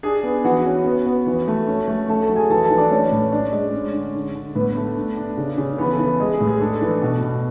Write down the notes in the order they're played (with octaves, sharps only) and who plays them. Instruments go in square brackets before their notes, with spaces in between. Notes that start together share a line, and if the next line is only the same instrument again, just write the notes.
[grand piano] D4 G#4 G#5
B3
E3 F#4 F#5
C#4
B3
B3
E3
A3
C#4
A3
A3 A4 A5
A4 A5
F#3
G#4 G#5
E3 A4 A5
A4 A5
E3
D4 D5
A3 C#4 C#5
A2
D4 D5
G#3
C#4
D3
D3
D3
A2 B3 B4
A3
D4
D4
C#3
C#3
E3 B3 B4
A4
E3
A4
G#3 G#4
G#4
A2
G#4
D4 A4
E3
B2
B2